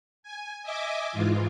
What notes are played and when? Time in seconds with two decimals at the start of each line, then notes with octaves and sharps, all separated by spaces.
0.23 G#5
0.63 D#5 E5 G#5 D6
1.12 G#2 E3 F4